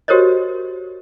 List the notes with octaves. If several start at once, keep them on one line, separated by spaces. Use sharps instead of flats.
F#4 G4 A#4 C5 C#5 D#5